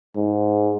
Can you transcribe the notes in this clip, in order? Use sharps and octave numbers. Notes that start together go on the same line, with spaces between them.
G#2